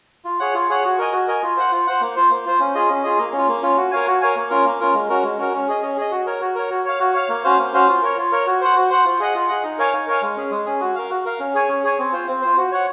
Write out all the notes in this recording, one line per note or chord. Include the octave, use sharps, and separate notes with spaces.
F4
G#4 C#5 F#5
F4
G#4 C#5 F#5
F#4
A#4 D#5 G#5
F#4
A#4 D#5 G#5
F4
C5 F#5
F4
C5 F#5
A#3
F4 C5
A#3
F4 C5
C#4
F4 G#4 D#5
C#4
F4 G#4 D#5
A#3
C#4
F4
A#3
C#4 F4
F#4
A#4 C#5 F5 G#5
F#4
A#4 C#5 F5 G#5
A#3
C#4 F4 A#4
A#3
C#4 F4 A#4
G#3
C#4 F#4 A#4
G#3
C#4 F#4 A#4
C#4
G#4 D#5
C#4
G#4 D#5
F#4
A#4 C#5
F#4
A#4 C#5
F#4
C#5 F5
F#4
C#5 F5
A#3
C#4 F#4 C5 F5
A#3
C#4 F#4 C5 F5
F4
A#4 C#5
F4
A#4 C#5
F#4
C5 F#5
F#4
C5 F#5
F4
G#4 D#5 F#5
F4
G#4 D#5 F#5
D#4
A#4 C#5 F5 G#5
D#4
A#4 C#5 F5 G#5
G#3
C#4 G#4
G#3
C#4 G#4
F#4
A#4 F5
F#4
A#4 F5
C#4
G#4 C#5 G#5
C#4
G#4 C#5 G#5
C4
F4 C5
C4
F4 C5
F#4
C#5 F#5